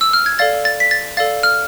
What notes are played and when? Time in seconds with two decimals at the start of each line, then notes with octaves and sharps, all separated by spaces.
0.01 E6
0.13 F6
0.26 G#6
0.39 A4 D5 F5 A6
0.65 A6
0.80 B6
0.91 A6
1.17 A4 D5 F5 A6
1.43 F6